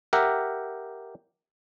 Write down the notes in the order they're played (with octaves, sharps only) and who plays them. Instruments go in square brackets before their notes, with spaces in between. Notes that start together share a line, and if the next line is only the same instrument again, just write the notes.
[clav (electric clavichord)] G4 A#4 E5 F#5